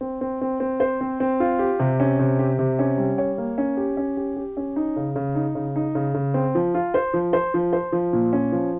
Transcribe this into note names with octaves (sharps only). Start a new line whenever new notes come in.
C4
C4
C4
C4
C5
C4
C4
F4
G4
C3
C#4
C3
G4
C3
C#4
G3
C#5
A#3
C#4
G4
C#4
G4
G4
C#4
D#4
C#3
C#3
D#4
C#3
D#4
C#3
C#3
C4
F3
F4
C5
F3
C5
F3
C5
F3
A#2
C#4
F3